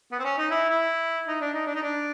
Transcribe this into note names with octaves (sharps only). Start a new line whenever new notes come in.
B3
C4
C#4
D#4
E4
E4
D#4
D4
D#4
D4
D#4
D4